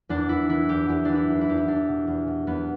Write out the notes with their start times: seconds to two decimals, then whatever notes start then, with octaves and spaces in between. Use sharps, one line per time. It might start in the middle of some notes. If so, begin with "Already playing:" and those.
0.09 E2 D4
0.29 E2 E4
0.49 E3 E4
0.69 E2 G4
0.88 E2 G4
1.05 E3 D4
1.15 E4
1.28 E2
1.41 E4
1.48 E2 G4
1.57 E4
1.68 E2 D4
1.88 B2
2.07 E2
2.27 B2
2.47 E2 B3